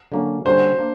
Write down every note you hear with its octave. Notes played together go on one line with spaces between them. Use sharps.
D3 F#3 A#3 C#4
D3 G3 A#3 C#4 F#4 C5
A#3 D4